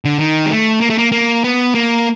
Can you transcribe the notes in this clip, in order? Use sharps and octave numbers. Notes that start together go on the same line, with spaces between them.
D3
D#3
G#3
A3
A#3
A3
A#3
A#3
B3
A#3